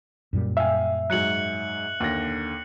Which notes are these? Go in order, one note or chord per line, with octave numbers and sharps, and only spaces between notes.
F#2 A#2 G3
E5 F5 G5 G#5
G#2 F#3 F#6 C#7 F#7
D#2 D3 A#6